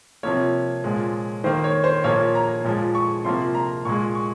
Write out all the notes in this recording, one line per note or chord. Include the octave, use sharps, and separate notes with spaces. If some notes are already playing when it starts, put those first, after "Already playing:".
C3 F3 A#3 C#5
A#2 F3 G#3
D#3 A#3 C5
C#5
C5
A#2 F3 A#3 C#5
A#5
A#2 F3 G#3
C#6
C3 F3 A#3 C6
A#5
A#2 G#3 C#6
C#6